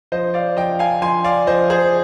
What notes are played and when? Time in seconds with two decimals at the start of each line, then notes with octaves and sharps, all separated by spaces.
0.12 F3 C5 D#5
0.34 D5 F5
0.57 F3 D#5 G5
0.79 F5 G#5
1.02 F3 G#5 C6
1.24 D5 F5
1.47 F3 C5 D#5
1.70 G#4 C5